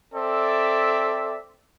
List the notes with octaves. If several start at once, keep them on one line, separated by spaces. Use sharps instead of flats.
C4 A4 D5 E5